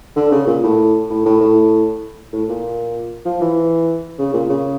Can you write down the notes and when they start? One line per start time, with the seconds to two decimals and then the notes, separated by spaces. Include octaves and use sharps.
0.17 D3
0.32 C#3
0.47 A#2
0.64 A2
1.10 A2
1.25 A2
1.41 A2
2.33 A2
2.49 A#2
3.26 F3
3.41 E3
4.19 C#3
4.34 A#2
4.49 C#3